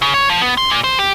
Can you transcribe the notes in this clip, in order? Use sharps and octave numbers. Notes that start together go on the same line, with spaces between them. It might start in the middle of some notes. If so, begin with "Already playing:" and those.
C#3
C#5
F3
B3
C6
A#2
C5
G4